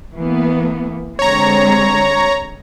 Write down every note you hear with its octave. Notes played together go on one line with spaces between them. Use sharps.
E3 A#3 B3
D3 G#3 C4 C#5 A#5